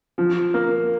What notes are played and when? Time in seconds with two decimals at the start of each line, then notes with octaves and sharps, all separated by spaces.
0.18 F3
0.54 A#3